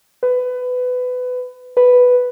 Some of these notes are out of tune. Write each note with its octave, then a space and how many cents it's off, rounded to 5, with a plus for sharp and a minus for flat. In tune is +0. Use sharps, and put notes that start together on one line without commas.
B4 +20
B4 +0